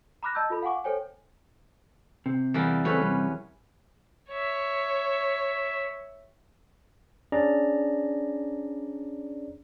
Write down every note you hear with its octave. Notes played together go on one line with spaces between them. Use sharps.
A#5 B5 D6 F6 F#6 A#6
D#5 A5 A#5 E6 G6
F4 A4 B5
F5 F#5 G#5 C#6 D6
A4 C5 C#5 G5 G#5
C3
E2 G3 A#3
C#2 A3 C4 C#4 B4 C#5
C3 G3
C#5 E5
C#4 D4 G#4 D5 A#5